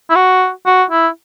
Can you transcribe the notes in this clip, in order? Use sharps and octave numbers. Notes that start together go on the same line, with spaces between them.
E4
F#4
F#4
E4